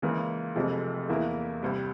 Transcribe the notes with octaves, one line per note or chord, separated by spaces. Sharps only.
C#2 C#3 E3 A#3
F1 F2 C3 F3 G#3
E2 E3 A#3 E4
C2 C3 G3